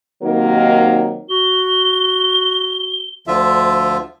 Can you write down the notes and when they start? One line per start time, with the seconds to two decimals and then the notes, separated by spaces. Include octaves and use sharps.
0.22 C3 D#3 F#3 A#3 D#4 A#4
1.29 F#4 G7
3.27 D2 D3 F3 F4 E5